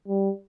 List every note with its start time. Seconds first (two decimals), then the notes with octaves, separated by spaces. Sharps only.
0.08 G3